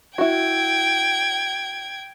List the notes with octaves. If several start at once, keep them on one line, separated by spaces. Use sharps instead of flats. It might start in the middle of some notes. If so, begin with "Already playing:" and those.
E4 F#4 G5 G#6